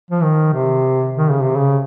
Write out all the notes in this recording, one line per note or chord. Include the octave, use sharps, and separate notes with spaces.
F3
D#3
C3
D#3
C#3
C3
C#3